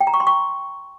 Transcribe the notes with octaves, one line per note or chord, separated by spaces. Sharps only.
G5
A#5
C#6
C6
C#6